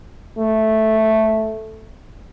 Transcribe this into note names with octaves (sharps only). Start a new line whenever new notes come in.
A3